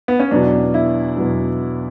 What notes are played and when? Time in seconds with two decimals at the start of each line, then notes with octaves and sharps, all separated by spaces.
0.08 B3
0.20 C#4
0.31 E2 B2 F#3 D4
0.74 E4
1.17 E2 B2 F#3